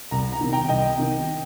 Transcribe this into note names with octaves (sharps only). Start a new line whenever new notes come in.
C2 A#5
A#5
C3 D#3
G5 A#5
C2 D#5 G5
C3 D#3